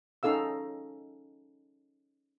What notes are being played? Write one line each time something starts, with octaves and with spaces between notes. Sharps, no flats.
C#4 D#4 A4 F5 E6